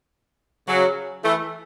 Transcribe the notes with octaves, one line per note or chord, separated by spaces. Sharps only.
C#3 F#3
E3 A3